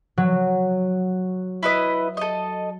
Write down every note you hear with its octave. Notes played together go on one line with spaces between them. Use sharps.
F#3
E4 B4 D#5
A4 D#5